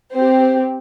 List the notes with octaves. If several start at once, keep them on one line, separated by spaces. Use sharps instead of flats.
C4 G4 C5